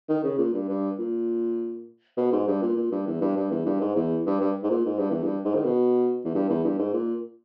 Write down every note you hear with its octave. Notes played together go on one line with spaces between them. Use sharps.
D#3
C#3
A#2
G2
G2
A#2
B2
G#2
G2
A#2
A#2
G2
E2
G2
G2
E2
G2
G#2
E2
G2
G2
G#2
A#2
G#2
G2
E2
G2
G#2
D#3
B2
E2
G2
E2
G2
G#2
A#2